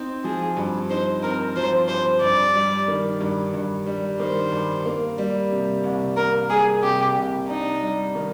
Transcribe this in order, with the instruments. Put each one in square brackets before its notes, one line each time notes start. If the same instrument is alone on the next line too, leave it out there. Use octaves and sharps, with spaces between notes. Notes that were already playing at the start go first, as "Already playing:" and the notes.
Already playing: [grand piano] C4 D#4
[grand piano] F3 [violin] G#4
[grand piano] G2
[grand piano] D#4 [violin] C5
[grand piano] C4 [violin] A#4
[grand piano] F3 [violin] C5
[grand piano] G2 [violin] C5
[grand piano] G2 [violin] D5
[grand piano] G3
D#3
G2
G2
G3
[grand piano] D#3 [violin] C5
[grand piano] G2
A#3
G3
C3
C2
[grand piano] A#3 [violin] A#4
[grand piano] G3 [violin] G#4
[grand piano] C3 [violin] G4
[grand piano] C2
[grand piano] D4 [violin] D#4
[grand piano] G3
D#3